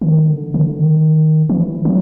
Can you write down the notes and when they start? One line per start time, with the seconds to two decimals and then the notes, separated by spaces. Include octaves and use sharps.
0.01 D3
0.06 D#3
0.30 D3
0.54 D3
0.78 D#3
1.49 E3
1.85 F#3